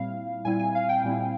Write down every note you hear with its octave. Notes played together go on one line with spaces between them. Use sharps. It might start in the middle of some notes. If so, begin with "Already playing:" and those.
Already playing: A#2 G3 C4 E4 F5
A#2 G3 C4 E4 G#5
G#5
F5
G5
A#2 G3 C4 E4